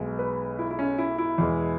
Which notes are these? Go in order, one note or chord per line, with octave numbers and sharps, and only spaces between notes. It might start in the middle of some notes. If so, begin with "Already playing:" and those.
Already playing: B1 B2 G#3
B4
E4
E4
C#4
E4
E4
E2 B2 G#3